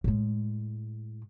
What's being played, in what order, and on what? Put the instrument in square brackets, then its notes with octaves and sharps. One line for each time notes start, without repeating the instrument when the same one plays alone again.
[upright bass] A2 G#3